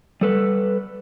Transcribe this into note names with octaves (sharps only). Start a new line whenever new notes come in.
G3 A4 B4